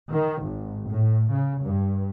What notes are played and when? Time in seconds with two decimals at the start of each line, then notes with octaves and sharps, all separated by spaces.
0.12 D#3
0.42 G#1
0.87 A2
1.31 C#3
1.63 G2